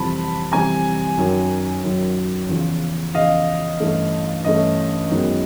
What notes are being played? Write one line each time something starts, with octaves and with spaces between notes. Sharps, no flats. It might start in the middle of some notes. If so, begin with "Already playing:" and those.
Already playing: F2 C3 E3 G3 C4 A5 B5
F2 C3 E3 G3 C4 G#5 A#5
F#2 D#3 F#3
F#2 D#3 F#3
E2 C#3 F3
E2 C#3 F3 D#5 F5
G2 E3 A3 C#4
G2 E3 A3 C#4 D#5
F#2 D#3 G#3 B3 D#4